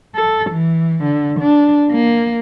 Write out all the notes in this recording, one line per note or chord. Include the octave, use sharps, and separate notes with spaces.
A4
E3
D3
D4
A#3